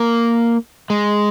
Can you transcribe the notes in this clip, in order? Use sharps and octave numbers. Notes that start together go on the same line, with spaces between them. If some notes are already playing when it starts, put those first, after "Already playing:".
Already playing: A#3
G#3